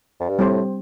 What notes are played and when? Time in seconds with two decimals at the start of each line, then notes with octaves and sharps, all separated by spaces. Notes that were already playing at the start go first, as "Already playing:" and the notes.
0.20 F2
0.29 G2
0.39 A2 G3 C4 G4 C5